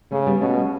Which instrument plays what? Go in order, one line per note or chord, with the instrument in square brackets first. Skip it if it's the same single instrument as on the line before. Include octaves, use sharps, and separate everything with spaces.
[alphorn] C#3 [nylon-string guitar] A3 C#4
[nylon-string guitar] G3 B3
[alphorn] B2 [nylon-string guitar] A3 C#4